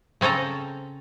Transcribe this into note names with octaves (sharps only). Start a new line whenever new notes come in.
C#3 C4 C#4 A4 A#5